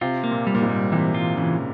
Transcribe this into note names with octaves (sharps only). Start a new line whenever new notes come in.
C3 F4
A#3
A#2
G3
A#2
G#2
G3
C3 E3
F4
C#3 E3